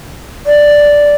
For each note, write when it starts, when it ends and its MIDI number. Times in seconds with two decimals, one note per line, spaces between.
0.46 1.16 74